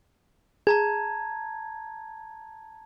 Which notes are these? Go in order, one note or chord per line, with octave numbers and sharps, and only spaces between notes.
G#4 A5 A#5 G#6